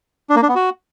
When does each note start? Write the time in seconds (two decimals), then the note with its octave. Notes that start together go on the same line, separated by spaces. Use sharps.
0.30 D4
0.36 A#3
0.42 D4
0.49 B3
0.55 F#4